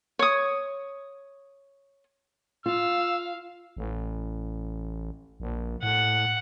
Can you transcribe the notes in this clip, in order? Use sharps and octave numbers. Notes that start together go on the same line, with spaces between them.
C#5 D#6
F4 F5 E6
A1
A#1
A2 F#5